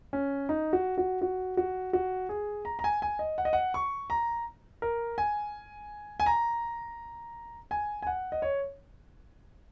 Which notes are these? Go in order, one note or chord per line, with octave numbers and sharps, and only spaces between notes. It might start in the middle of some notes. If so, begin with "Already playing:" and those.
C#4
D#4
F#4
F#4
F#4
F#4
F#4
G#4
A#5
A#5
G#5
G#5
D#5
F#5
D#5
F#5
C#6
A#5
A#4
G#5
G#5
A#5
G#5
G#5
F#5
D#5
C#5